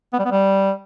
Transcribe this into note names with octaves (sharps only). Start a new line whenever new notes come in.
B3
G3
B3
G3